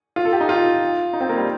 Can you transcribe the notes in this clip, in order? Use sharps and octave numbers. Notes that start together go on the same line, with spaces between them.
F4
A4
G4
D#4
F4
D#4
C4
A#3
G3